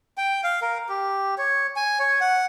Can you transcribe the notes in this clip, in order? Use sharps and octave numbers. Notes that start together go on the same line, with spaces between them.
G5
F5
A#4
G4
C#5
G#5
C#5
F#5